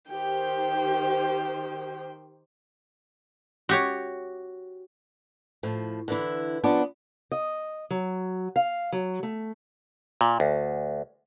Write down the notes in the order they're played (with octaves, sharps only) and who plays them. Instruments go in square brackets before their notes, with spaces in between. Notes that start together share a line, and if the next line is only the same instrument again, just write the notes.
[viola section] D#3 G4 C5 [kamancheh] G5
[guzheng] F#4 G4 C#5
[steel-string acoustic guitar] A2 F3
D3 E3 E4
F3 B3 C#4 D4
D#5
F#3
F5
F#3
A3
[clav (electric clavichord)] A#2
D2